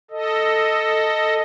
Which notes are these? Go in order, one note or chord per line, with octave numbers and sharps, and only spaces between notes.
A4 D#5